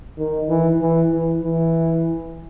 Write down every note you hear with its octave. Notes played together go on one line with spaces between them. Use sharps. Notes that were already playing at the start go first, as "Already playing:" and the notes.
D#3
E3
E3
E3
E3